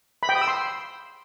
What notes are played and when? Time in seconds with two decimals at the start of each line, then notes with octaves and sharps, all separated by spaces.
0.23 B5
0.29 G5
0.35 D#6
0.41 E6
0.48 C6